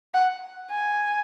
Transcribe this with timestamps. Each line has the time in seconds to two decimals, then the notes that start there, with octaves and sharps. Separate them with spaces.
0.14 F#5
0.70 G#5